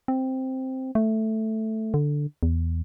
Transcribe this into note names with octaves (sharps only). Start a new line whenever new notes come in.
C4
A3
D3
E2